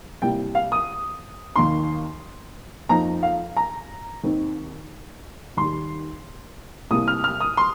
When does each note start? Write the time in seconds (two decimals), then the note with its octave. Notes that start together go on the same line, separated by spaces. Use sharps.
0.22 C2 C3 G3 A#3 G5
0.55 F5
0.72 D#6
1.56 D#2 D#3 A#3 D#4 C6
2.89 F2 F3 A#3 D#4 A#5
3.23 F5
3.57 A#5
4.24 D#2 D#3 C4 D#4
5.57 D#2 D#3 G3 C6
6.90 C2 C3 G3 A#3 D#6
7.08 F6
7.24 F6
7.41 D#6
7.57 C6